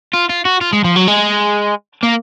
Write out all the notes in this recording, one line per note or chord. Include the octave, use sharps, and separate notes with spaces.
F4
F4
F#4
F4
G#3
F3
F#3
G#3
A#3